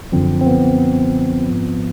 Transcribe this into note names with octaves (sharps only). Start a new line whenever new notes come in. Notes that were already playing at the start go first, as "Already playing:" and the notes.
F#2 D3 F3 C4
C4
B3
G#2 F3